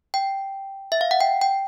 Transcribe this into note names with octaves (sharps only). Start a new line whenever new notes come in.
G5
E5
F5
F#5
G5
G5